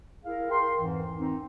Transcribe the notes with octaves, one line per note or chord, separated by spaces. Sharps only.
E4 G#4 A#4 F5
A#4 G5 C6
F2 G#2 E3
C4 D#4